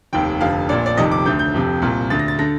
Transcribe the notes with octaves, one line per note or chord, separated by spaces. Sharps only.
F1 D#2 D#3 G5
F1 F2 D3 F5
A#1 A#2 D5
D5
F1 F2 C3 D#3 D#5
D6
D2 D3 G6
G6
F1 F2 C3
C2 A#2
D2 D3 A6
A#6
A6
D3 A#6